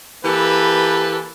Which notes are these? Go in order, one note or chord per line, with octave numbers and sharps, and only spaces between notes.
E3 A#3 G4 A4 B4